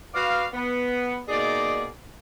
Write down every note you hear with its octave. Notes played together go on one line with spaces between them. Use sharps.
F#4 B4 D5 F5
B3
B2 A#3 D#4 G#4 D5